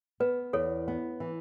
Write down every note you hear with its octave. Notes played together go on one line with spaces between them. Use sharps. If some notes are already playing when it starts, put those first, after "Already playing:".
B3 B4
E2 A4 C#5
B3
E3